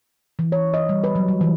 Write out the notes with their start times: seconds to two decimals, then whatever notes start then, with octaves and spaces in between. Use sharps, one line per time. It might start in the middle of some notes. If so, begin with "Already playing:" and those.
0.39 E3
0.52 C#5
0.74 D#5
0.89 G3
1.04 B4
1.15 F#3
1.28 G3
1.41 E3